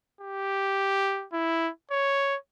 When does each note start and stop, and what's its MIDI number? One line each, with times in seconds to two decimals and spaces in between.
0.21 1.26 67
1.33 1.70 64
1.91 2.36 73